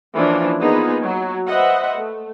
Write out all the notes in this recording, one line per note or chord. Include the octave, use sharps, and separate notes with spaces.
E3 F3 A#3 C#4 D4
A#3 B3 D#4 F4 G#4 B4
F#3 F#4
B4 C5 D#5 E5 F#5
A3